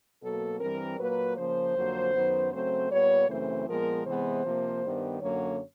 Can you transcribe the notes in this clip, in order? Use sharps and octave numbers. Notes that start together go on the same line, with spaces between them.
B2 F#3 A#3 A4
G2 E3 G3 C4 A#4
A#2 F#3 A#3 B4
C#3 F3 A#3 C5
F2 D3 F#3 A#3
F#2 D#3 F#3 B3
C#3 F#3 A3 C4 C5
A#2 G3 B3 C#5
F#2 C#3 E3 A3 C4 C5
A#2 F3 G#3 B3 A#4
C3 E3 G#3 B3 C5
C3 F3 A#3
G2 D#3 G3 B3
F#2 D3 F#3 A#3 C#5